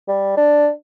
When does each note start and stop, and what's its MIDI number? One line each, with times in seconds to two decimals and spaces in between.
0.08 0.35 55
0.37 0.69 62